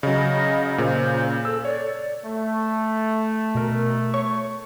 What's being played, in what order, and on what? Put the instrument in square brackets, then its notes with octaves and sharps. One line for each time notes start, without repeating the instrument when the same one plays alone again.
[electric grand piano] C#3 F#3 [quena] D#5
[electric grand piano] A#2 C#3 [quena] C5
[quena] A4 [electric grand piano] E6
[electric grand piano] C#5 [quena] D5
[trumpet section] A3
[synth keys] B2 A#4
C#5 C#6